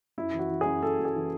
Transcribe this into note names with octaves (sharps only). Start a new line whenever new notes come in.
F#2 E4
E3
F#4
E3
F#2 G#4
F#2 A4
F#2
G#4
E3